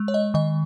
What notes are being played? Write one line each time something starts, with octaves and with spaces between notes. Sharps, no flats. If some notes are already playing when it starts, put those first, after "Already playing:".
Already playing: G#3
C#5
D#5
D#3 D#5